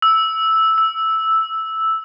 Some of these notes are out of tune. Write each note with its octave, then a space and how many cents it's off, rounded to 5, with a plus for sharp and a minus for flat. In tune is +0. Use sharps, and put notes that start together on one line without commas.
E6 -5
E6 +0